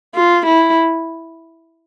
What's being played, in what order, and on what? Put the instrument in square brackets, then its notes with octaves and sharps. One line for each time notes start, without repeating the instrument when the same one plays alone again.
[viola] F4
E4